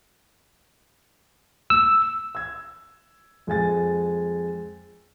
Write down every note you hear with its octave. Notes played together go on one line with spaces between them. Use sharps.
E6
E6 G#6
F2 G#3 G#5 A6